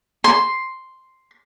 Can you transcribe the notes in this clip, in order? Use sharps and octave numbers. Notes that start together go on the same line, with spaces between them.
C6